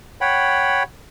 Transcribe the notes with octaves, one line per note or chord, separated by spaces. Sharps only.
C#5 F#5 G5 B5